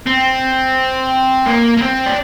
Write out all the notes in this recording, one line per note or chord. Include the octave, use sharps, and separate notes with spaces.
C4
A#3
A#3
C4
D4